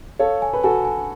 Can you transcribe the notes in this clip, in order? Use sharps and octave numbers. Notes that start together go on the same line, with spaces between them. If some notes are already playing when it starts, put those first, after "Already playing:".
A4 C#5 F5
G#5
B4
F#4 A4 G#5
G#5